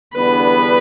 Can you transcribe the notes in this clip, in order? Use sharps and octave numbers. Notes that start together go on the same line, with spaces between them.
E2 D3 G3 B3 D4 B4